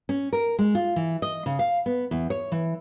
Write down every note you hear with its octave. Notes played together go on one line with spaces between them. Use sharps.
C#4
A#4
G#3
F4
E3
D#5
C#3
F5
B3
E2
C#5
E3